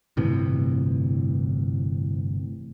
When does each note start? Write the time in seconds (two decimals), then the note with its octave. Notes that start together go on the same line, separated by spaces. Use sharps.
0.17 G1 A2 C3 E3